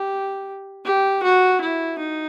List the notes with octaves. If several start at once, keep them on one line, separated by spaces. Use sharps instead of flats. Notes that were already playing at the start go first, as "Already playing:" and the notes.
Already playing: G4
G4
F#4
E4
D#4